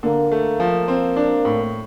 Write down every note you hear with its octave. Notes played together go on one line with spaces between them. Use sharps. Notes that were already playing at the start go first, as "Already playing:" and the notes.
D3 A#3
A3
F3
C4
D4
A2